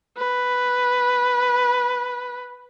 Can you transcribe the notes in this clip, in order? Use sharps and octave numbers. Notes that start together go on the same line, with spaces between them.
B4